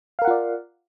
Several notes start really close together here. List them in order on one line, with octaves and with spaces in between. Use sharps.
F5 A#4 F#5 F4 D5